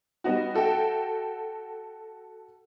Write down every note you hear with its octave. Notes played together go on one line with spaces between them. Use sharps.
G3 B3 D#4 F#4
F#4 A4 E5 G5